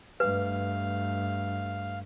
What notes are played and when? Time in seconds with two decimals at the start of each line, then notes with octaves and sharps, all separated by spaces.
0.20 G2 A3 B4 F5